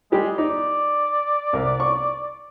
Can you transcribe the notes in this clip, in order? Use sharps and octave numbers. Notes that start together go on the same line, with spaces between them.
G3 G#3 G4
D#4 D5
C2 A#4
C#6